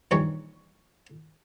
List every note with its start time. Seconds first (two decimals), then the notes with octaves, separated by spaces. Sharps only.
0.11 A#1 G2 D#3 E3 C#5 C#6